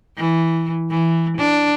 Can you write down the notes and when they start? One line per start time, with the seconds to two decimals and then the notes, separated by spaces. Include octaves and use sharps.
0.16 E3
0.90 E3
1.37 D4